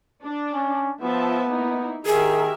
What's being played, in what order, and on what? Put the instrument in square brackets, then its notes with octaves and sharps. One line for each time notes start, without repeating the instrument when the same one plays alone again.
[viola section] D4
[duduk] C#4
[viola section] F3 E5 A5 [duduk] B3
[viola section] A#3 D#4 E4
[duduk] D#3 [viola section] G4 A#4 E5 [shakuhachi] G#4